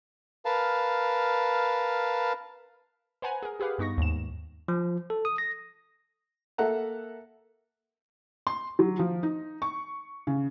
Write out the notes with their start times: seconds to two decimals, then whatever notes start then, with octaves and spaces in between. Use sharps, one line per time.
0.45 A#4 B4 F5 A5
3.22 B4 C5 F#5 G#5 A#5
3.43 G#4 A#4
3.60 G4 G#4 B4 F5 F#5
3.78 G2 B3 D#4 C#6 A#6
3.98 D#2 G#2 E7
4.68 F3
5.10 A4
5.25 D#6
5.38 A#6
6.58 A#3 A4 E5 F#5 A#5
8.47 C6
8.79 F#3
8.99 F3
9.23 D#4
9.62 C#6
10.27 C#3